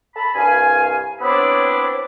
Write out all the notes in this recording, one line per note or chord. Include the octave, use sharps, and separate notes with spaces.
A4 A5 B5
C2 G2 F5 G#5
B3 C4 D4 E4 C#5